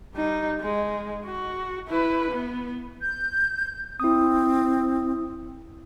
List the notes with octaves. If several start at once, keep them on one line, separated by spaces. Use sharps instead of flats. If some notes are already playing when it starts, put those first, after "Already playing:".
G3 D#4
G#3
F#4
E4 B4
B3
G6
C4 E4 D#6